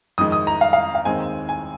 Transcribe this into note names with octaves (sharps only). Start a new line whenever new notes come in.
F2 D#3 G#3 D#6
D#6
A#5
F5
F5
F5
D#2 D#3 G#3 C4 G#5
G#5